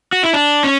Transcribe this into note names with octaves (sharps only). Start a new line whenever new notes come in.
F#4
E4
D4
C#4